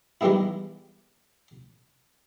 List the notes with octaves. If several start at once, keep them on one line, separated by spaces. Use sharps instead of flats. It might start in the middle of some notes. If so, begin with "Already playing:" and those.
D#3 E3 G3 G#3 B3 E4